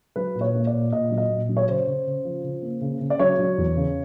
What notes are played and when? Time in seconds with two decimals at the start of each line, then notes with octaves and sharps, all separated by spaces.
0.16 F#3 B4
0.35 A#2
0.41 C#5
0.55 A#3
0.67 D5
0.73 A#2
0.92 A#2 D#5
1.11 F#3
1.18 D#5
1.29 A#2
1.49 F#3
1.57 C#5
1.68 C#3 C5
1.87 C#3
2.06 C#3
2.25 F3
2.44 C#3
2.62 A#3
2.81 C#3
3.01 C#3
3.10 D5
3.19 F#3 C#5
3.39 F#3
3.58 E2
3.76 C#3